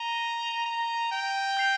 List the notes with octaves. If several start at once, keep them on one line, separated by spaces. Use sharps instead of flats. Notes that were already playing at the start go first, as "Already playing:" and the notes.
Already playing: A#5 A#6 D#7 G7
A#5
G5
G6 C7 F7